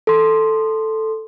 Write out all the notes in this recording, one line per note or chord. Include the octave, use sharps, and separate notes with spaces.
A4 C6